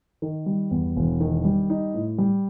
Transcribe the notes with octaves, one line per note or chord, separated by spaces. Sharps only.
D#3
G3
E2
E1
D#3
G3
D#4
A2
G3